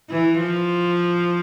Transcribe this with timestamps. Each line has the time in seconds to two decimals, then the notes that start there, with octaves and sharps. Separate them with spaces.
0.10 E3
0.41 F3